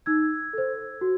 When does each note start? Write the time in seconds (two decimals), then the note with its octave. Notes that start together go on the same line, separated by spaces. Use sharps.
0.06 D#4 E6 G#6
0.53 A4 C5
1.01 F#4